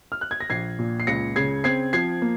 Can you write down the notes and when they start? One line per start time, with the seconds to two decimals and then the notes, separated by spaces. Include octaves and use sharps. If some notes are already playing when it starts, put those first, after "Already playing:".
0.12 F6
0.21 F#6
0.31 G#6
0.41 A#6
0.50 A#1 G#6 C7
0.79 A#2
1.00 C7
1.07 C#2 A#6 C#7
1.36 C#3 G#6 C7
1.64 C4 G#6 C7
1.93 F3 G#6 C7
2.22 A#3